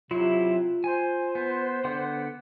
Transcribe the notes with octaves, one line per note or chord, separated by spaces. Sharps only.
C3 F#3 E4 F4 C6
C5 G#5
B3
D3 B3 F#5